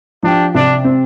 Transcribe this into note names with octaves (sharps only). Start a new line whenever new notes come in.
F3 D4 G4
C3 D4
C4